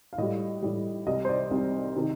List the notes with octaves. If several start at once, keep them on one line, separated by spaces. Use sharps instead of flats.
F5
A2 G3 D#5
A2 G3
C2 C3 G3 D#5
C5
D5
C2 C3 G3
C3 D#3